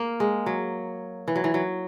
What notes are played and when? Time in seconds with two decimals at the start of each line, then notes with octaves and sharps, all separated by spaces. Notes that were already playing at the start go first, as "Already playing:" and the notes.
Already playing: A#3
0.20 G#3
0.46 F#3
1.28 E3
1.36 F#3
1.44 E3
1.54 F#3